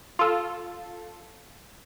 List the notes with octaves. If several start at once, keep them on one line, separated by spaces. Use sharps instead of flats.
F4 A4